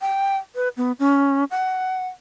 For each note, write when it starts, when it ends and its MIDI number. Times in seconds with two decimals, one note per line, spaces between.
0.01 0.37 79
0.55 0.69 71
0.77 0.92 59
0.99 1.44 61
1.51 2.08 78